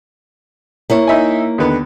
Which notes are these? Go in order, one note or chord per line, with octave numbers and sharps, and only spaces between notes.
A#3 E4 C#5
D#4 E5 G#5
D#2 D3 B3